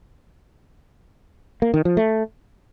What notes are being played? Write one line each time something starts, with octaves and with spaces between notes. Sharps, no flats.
A#3
D#3
F3
A3